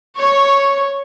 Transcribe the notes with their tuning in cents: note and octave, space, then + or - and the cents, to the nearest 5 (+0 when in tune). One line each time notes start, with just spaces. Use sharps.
C#5 +0 C#6 -10